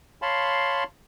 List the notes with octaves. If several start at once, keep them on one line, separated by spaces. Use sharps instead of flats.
C#5 F5 A5 B5 C6